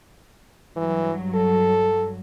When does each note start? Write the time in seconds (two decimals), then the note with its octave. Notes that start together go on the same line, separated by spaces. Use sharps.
0.76 G2 E3 F#3
1.35 A4